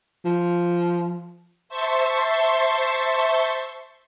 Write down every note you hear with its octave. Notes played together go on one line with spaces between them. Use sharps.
F3
C5 E5 A5 C6 C#6